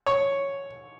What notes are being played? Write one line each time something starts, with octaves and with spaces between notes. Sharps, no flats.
C#5